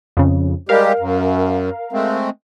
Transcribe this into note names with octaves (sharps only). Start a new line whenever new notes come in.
F2 C#3
G3 G#3 G4 A#4 F5
F#2
G#3 A3 C4